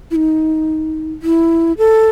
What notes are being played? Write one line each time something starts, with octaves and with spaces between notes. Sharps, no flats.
E4
D#4
E4
A4